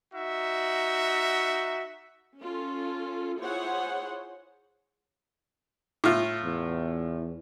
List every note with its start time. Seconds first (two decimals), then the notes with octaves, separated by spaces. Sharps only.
0.14 D#4 F#4 E5
2.39 C#4 F4 A4
3.40 E4 F4 G#4 C5 C#5 F#5
6.04 A2 F4
6.43 E2